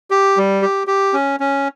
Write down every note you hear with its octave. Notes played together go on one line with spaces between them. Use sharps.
G4
G3
G4
G4
C#4
C#4